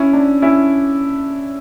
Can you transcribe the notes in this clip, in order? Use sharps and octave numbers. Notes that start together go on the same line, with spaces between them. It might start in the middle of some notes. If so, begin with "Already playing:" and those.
Already playing: C#4 E4
D4
C#4 E4